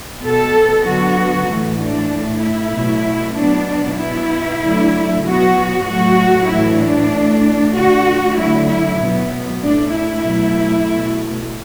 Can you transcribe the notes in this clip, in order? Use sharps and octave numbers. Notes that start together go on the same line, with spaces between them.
B2 B3 A4
D3 F#3 B3 F#4
A2 E3 A3
D4
A2 A3
E4
B2 F#3 A3
B2 F#3 B3 D4
B2 B3 E4
D3 F#3 A3
B2 F#3 B3 F#4
A2 F#3 A3 F#4
A2 E3 A3 E4
D4
A2 A3
D3 A3 F#4
D3 F#3 A3 E4
E4
B2 F#3 B3
A2 A3 D4
E4
B2 F#3 A3
B2 A3